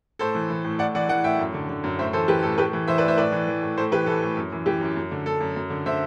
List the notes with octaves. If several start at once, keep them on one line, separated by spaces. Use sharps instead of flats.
A2 A4 C5
E3
E3
A2
A2 D5 F#5
E3 D5 F#5
E3 D5 F#5
A2 E5 G5
F#2
D3
D3
F#2
A2 C5 E5
E3 A4 C5
E3 G4 B4
A2 A4
A2 G4 B4
E3
E3 C5 E5
B4 D5
A2 C5 E5
A2 B4 D5
E3
E3
A2
A2 A4 C5
E3 G4 B4
E3 A4
A2
F#2
E3
E3 G4
F#2
F#2
D3
D3 A4
F#2
F#2
D3
D3 C5 E5